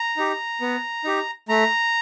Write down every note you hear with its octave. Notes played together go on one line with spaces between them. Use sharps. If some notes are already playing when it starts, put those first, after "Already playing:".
Already playing: A#5
D#4 G4
B3
D#4 G4
A3 A#5